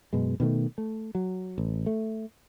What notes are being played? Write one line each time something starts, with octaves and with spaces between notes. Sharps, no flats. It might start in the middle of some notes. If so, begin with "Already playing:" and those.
F#2 B2 G#3
B2 D#3 F#3 A3
A3
F#3
A1
A3